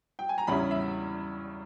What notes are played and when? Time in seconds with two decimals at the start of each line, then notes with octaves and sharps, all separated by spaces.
0.19 G5
0.29 G#5
0.38 A#5
0.47 E2 C#3 G3 C#4 E4 B5
0.71 E5